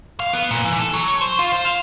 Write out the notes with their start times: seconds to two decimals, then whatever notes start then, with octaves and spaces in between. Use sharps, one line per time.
0.20 F5
0.33 B3
0.51 A#2
0.65 E3
0.79 A4
0.93 F#3
1.08 C#5
1.21 C5
1.39 F4
1.52 C5
1.65 F5